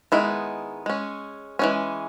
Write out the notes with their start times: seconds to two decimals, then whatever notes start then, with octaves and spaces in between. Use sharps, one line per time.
0.12 D#3 G#3 B3 E4
0.86 G#3 C#4
1.59 E3 G#3 C#4